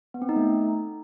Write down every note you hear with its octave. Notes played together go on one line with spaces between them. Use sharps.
B3
C4
D#4
A3